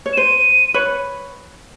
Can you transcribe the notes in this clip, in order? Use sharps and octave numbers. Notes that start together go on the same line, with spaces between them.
C#5
E7
C5 D#7
B4 C#5